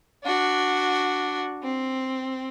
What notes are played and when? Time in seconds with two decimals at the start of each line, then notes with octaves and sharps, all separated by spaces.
0.25 D4 F#4
1.63 C4